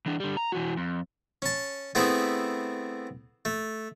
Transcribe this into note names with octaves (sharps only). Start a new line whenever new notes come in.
E3 D4
D3 G3
A#5
E3 F#4
F2
C#4 A5
A3 B3 C4 E4 G#4
A3